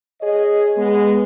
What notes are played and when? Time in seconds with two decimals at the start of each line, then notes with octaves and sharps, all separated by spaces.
0.22 G#4 C#5 D#5
0.77 G#3 B3